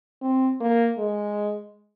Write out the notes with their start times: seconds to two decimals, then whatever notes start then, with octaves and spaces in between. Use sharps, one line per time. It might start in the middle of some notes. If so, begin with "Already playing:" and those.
0.22 C4
0.60 A#3
0.98 G#3